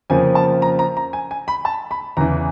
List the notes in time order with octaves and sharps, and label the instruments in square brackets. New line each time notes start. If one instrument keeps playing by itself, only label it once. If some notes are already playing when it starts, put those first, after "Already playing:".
[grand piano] F2 C#3 F3 A#3 G#5
A5
A#5
A#5
A#5
G#5
G#5
B5
A5
B5
E2 C#3 E3 A#5